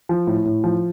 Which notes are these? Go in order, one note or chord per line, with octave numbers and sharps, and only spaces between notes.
F3
A2
A2
F3